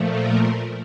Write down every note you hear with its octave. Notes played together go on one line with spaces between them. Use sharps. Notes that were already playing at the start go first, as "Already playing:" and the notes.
Already playing: A#2 F3 A3
A#4